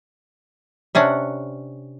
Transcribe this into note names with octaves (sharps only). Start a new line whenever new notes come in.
C3 C#4 D4 F#5